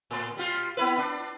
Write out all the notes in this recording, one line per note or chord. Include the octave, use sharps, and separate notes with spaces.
A2
G3 F4
B3 E4 B4
D4